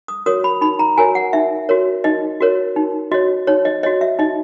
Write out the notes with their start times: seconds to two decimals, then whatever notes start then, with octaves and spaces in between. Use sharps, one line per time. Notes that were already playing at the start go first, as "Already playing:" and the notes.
0.08 D#6
0.26 F#4 A#4 C#5 D#6
0.44 B5
0.61 D#4 B5
0.79 A#5
0.97 F#4 A#4 C#5 G#5
1.15 F#5
1.33 D#4 E5
1.69 F#4 A#4 C#5
2.04 D#4 D#5
2.41 F#4 A#4 C#5
2.76 D#4
3.12 F#4 C#5 D#5
3.47 D#4 C#5
3.65 D#5
3.83 F#4 C#5 D#5
4.01 E5
4.19 D#4 D#5